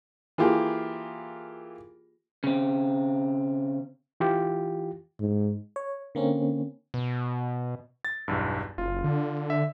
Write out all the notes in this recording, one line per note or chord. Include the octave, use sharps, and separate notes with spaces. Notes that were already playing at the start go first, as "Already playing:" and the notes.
E3 A#3 F4 G4 G#4
C#3 C4
E3 F4 G4
G#2
C#5
D3 A#3 C4 C#4
B2
A6
B1 E2 G2
F#1 F4
D3
E5